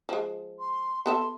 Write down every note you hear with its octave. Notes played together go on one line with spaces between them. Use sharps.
F3 G#3
C6
B3 A4 E5 C6